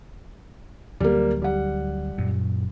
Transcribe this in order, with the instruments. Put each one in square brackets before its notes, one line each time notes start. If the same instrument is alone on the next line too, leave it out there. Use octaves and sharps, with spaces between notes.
[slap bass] D2 D3 F#3 [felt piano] G3 A#3
[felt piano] G3 F#5
[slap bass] F#2 A#2